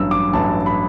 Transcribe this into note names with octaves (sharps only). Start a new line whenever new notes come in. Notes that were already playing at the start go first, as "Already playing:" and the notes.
Already playing: A1 G2 F#3 E6
D6
A1 G2 F#3 A5
B5